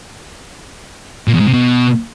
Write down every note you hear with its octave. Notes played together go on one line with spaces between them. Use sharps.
A#2
E2
G#2
C3
B2